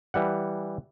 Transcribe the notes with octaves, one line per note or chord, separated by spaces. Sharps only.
E3 G3 F#5